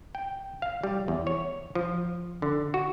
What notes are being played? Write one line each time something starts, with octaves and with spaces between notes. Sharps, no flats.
G5
F5
G3
E2
C#5
F3
D3
F#4